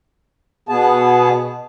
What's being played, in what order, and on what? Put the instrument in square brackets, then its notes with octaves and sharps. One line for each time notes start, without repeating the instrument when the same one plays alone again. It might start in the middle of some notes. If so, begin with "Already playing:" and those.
[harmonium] B2 B3 G#4 A5